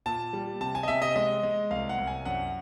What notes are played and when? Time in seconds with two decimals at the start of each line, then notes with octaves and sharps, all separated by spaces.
0.06 A#2 A5
0.33 G3
0.61 C3 A5
0.75 G#5
0.83 D#5
0.88 C3 E5
1.02 D#5
1.16 G#3 D#5
1.43 G#3
1.71 C2 F5
1.89 F#5
1.98 C2
2.07 G#5
2.25 F#2 F#5